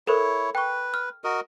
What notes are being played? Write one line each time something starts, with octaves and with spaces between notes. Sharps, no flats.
E4 A4 A#4 C5 C#5
B4 G5 C#6
F6
F#4 A#4 D#5